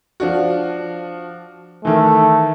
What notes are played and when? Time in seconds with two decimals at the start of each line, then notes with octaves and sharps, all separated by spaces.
0.20 F3 D4 F#4
1.85 D#3 E3 A3